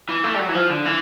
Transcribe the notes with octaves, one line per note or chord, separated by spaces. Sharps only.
E3
A3
G3
F#3
E3
F3
D3
E3